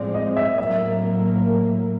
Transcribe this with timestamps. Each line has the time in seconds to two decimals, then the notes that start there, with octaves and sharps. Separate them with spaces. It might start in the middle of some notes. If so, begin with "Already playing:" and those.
Already playing: A2 F3 G#3 C4 D5
0.14 D#5
0.37 E5
0.58 A2 F#3 A#3 E5